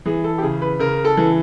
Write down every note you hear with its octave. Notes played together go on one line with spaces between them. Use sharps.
E3 G#4
A4
G4
C#3 G#4
B4
C#3 A#4
A4
E3